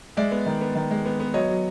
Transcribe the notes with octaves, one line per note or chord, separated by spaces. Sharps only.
G#3 D5 E5
B3
D#3
B3
D#3
G#3
B3
B3
F#3 C#5 D#5
F#3